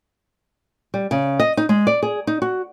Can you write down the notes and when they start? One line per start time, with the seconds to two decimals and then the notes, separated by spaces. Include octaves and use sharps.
0.94 G3
1.11 C#3
1.40 D#5
1.57 D#4
1.69 G#3
1.87 D5
2.03 G#4
2.27 D#4
2.42 F#4